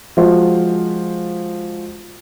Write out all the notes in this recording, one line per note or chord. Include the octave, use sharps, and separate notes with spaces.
F3 G#3 F4 F#4 C5